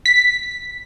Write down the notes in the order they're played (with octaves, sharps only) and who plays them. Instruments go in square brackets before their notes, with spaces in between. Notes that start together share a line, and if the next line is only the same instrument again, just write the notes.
[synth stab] B6